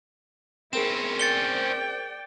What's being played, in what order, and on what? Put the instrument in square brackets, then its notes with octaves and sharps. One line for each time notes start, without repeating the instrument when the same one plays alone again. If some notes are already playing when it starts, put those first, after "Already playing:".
[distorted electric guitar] C4 C#4 [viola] E4 [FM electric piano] G#4 A#4 C5 [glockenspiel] E7
[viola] D5 G5 [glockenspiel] A6 C#7 G7